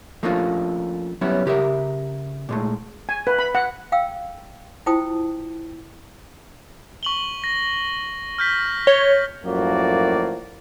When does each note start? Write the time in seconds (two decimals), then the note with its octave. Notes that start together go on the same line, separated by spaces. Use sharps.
0.23 F3 A3 A#3 C#4 D4 F4
1.21 F#3 G3 B3 C#4 E4
1.46 C#3 G4 A#4 E5
2.49 A#2 G#3 A3
3.09 G#5
3.27 B4
3.39 B5
3.55 F#5
3.92 F5 G5 E6
4.86 E4 F4 C5 G5 A5 D#6
7.03 C#6 F#7 G7
7.44 A#6
8.38 F6 G6 B6
8.87 C#5 G7
9.45 F#2 A2 F3 A#3 F#4 D5